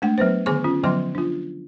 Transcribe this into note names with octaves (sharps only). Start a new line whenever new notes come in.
G#3 A3 D4 F#5
F#3 B3 B4 C5
D3 D#3 B3 G#4 G#5 C#6
C#4 F4
D3 F3 F#3 B3 G5 C6
D4 F4